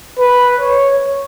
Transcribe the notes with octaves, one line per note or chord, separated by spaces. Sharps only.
B4
C#5